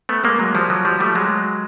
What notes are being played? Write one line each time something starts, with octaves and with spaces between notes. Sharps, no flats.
A3 B3
G#3 A#3
F#3 G#3
F3 G3
F#3
F3 G3
G3 A3
F#3 G#3